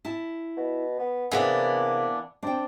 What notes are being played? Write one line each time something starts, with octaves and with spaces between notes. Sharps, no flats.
E4 A5
B2
B3
C3 E3 A#3 B3 D4 G#4
C4 D4 G5